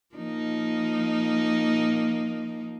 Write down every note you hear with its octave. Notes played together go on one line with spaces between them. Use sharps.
F3 A#3 D#4